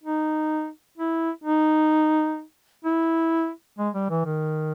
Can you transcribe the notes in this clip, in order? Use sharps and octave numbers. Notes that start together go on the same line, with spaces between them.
D#4
E4
D#4
E4
G#3
G3
E3
D#3